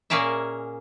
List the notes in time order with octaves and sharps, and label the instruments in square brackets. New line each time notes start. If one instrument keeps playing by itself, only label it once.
[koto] A#2 A#3 C#4 G#4 A#4 E5